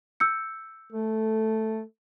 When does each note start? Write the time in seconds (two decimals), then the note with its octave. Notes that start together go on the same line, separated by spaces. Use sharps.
0.20 E6 G6 C#7
0.92 A3 A4